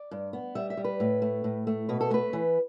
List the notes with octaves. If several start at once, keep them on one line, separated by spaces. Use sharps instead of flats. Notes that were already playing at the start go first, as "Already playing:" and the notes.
Already playing: D5
G2
B3
G3 E5
E5
G3
B4
A2
A3
A2
A3
B2 B4
A4
A3 B4
E3